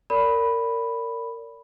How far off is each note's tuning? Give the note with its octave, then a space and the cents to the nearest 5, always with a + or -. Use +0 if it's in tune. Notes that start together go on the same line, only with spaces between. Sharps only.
A#4 -20 D5 -30 B5 +0